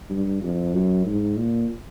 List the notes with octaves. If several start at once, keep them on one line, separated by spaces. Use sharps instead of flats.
G2
F2
F#2
G#2
A#2